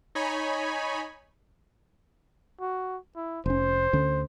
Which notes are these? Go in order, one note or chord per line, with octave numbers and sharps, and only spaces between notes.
D#4 C#5 G#5 B5
F#4
E4
F1 C#4 C5
D2 D3 C#4